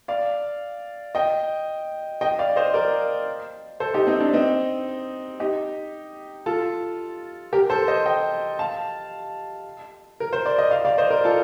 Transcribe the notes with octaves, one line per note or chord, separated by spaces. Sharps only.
D5 F5
D#5 G5
D#5 G5
D5 F5
C5 D#5
A#4 D5
A4 C5
D#4 G4
C4 D#4
D4
C4 D#4
D#4 G4
F4 A4
G4 A#4
A4 C5
C5 D#5
D#5 G5
F5 A5
A#4
C5
D5
D#5
D5 F5
D5 F5
C5 D#5
A#4 D5
F4 A4